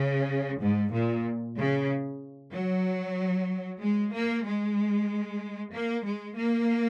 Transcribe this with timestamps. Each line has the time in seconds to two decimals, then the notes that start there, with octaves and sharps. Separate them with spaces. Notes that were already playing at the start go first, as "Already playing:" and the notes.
Already playing: C#3
0.61 G#2
0.93 A#2
1.57 C#3
2.52 F#3
3.81 G#3
4.13 A#3
4.44 G#3
5.72 A#3
6.04 G#3
6.37 A#3